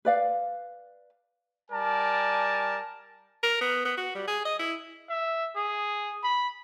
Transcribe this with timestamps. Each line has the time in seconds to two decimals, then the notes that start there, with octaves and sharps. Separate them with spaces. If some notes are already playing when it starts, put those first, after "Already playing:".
0.05 B4 D5 F5
1.71 G3 A#4 D5 G#5 A5
3.43 A#4
3.61 B3
3.85 B3
3.97 F#4
4.15 G3
4.27 G#4
4.45 D#5
4.59 E4
5.09 E5
5.56 G#4
6.24 B5